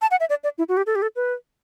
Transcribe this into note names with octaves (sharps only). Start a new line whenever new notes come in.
A5
F#5
E5
D5
D5
E4
F#4
G4
A4
G4
A4
B4